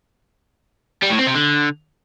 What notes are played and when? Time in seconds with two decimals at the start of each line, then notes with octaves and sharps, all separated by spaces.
1.02 G3
1.10 A2
1.18 C4
1.27 C3
1.35 D3